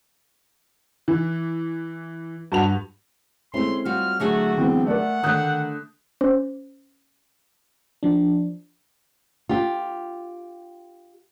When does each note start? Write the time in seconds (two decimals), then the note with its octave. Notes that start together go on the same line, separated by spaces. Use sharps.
1.08 E3
2.52 G2 F#4 F7
3.54 G#3 A3 C4 C#4 E4 C6
3.85 G3 F4 F#4 F6
4.20 D3 F#3 A3 F#4 G#4
4.57 E3 G#3 B3 C4
4.87 A3 A#4 D5 F#5
5.24 D3 D#3 A3 D#6 F#6 G6
6.21 C#4 C5
8.03 F3 D4
9.49 F4 G4